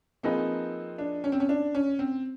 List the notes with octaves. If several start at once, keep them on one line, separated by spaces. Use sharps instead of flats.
F3 A#3 C4 D#4 G#4 B4
D4
C#4
C4
C#4
D4
C#4
C4